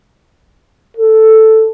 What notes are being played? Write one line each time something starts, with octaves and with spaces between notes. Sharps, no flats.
A4